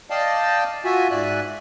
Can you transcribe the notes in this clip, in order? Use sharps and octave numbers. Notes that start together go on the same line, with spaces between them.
D5 D#5 F5 G5 A5
F4 F#4 E5 G#5
G#2 D5 E5 G#5 F#6